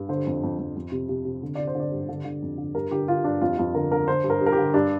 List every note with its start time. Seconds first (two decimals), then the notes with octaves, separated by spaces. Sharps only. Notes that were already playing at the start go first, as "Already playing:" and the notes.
Already playing: G2
0.09 D3 C5
0.26 F2
0.43 F2
0.59 F2
0.76 F2
0.92 C3
1.09 C3
1.25 C3
1.43 D3
1.55 D3 D5
1.67 C5
1.75 D3
1.80 D5
1.91 G2
2.09 D3
2.25 D3
2.42 F2
2.58 D3
2.75 G2 A#4
2.91 D3 G4
3.08 D3 F4
3.24 G2 D4
3.41 F2 F4
3.58 F2 F4
3.74 D3 A#4
3.92 D3 A#4
4.08 D3 C5
4.24 G2
4.30 A#4
4.41 G2
4.46 A#4
4.52 G4
4.58 D3
4.74 G2 D4